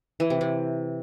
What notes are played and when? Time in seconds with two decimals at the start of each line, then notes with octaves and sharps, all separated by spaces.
0.20 E3
0.30 C3
0.41 C3